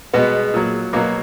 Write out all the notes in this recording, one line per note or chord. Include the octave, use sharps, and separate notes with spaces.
B2 G#3 B3
A#2 F#3
B2 F#3 A#3